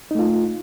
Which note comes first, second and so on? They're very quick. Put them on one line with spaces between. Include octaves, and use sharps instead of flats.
D#4 A3 F4